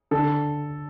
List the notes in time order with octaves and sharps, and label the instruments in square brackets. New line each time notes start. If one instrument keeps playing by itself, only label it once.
[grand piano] D3 A4